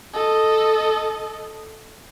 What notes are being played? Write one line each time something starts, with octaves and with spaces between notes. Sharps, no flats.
A4 D#5